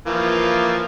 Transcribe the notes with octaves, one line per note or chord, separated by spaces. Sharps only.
E3 F3 A#3